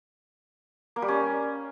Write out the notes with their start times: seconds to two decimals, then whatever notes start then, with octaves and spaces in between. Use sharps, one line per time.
0.96 A#3
1.02 G3
1.08 C#4